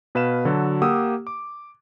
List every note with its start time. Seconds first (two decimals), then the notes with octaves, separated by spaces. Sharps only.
0.15 B2 B4 F5 E7
0.45 D3 F#3 F#4 A4
0.82 A#3 G4 F#5 D#6 E6
1.27 D6